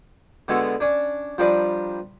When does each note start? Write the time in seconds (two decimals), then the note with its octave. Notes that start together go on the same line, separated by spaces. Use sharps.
0.48 D3 G#3 B3 F#4 A4
0.80 C#4 D4
1.38 F3 G3 D4 A#4 B4